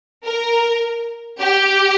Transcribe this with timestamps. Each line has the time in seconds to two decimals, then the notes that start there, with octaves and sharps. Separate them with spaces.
0.24 A#4
1.40 G4